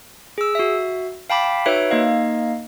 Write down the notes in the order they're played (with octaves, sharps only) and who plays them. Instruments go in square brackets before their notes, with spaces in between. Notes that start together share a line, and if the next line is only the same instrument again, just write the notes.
[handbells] G#4 E6
F#4 E5
F5 G5 A5 B5 D6 B6
D#4 F#4 B4 C#5 E5 D7
A#3 D#4 D#5 F5